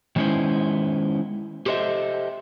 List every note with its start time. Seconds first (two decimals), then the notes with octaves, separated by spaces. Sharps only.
0.16 D#3 G#3 B3 C#4 E4 C5
1.66 G4 A4 C5 D#5 E5